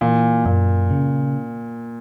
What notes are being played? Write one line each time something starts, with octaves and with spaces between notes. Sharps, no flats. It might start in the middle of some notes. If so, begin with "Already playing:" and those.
A#2 E3
F#2 A#2
C#3